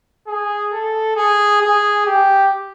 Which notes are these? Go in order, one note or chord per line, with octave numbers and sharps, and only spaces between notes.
G#4
A4
G#4
G#4
G4